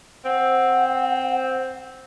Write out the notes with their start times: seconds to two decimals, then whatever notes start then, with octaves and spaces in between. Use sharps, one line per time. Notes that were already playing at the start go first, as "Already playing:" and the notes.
0.25 C4 F#5